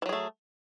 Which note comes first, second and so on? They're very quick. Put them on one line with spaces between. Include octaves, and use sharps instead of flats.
E3 F#3 G#4 A3